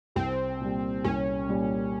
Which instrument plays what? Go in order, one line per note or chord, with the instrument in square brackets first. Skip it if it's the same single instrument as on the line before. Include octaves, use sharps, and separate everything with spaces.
[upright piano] C2 [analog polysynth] C4
[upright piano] A#2 G3
[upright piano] C2 [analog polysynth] C#4
[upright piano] A#2 G3